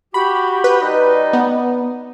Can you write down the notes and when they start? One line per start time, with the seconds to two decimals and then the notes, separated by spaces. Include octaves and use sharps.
0.14 F#4 G4 B5
0.64 B4
0.82 G3 D#4 D#5
1.33 B3